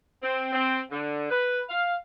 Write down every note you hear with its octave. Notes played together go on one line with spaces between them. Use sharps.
C4
C4
D3
B4
F5